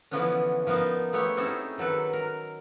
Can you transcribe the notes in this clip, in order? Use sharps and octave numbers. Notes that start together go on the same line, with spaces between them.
D3 E3 F3 B3 C#4 D4
F3 A#3 B3 D#4
A3 B3 G4 C#5
C4 C#4 D#4 E4 G#4 A4
D#3 F#3 A4 B4
A#4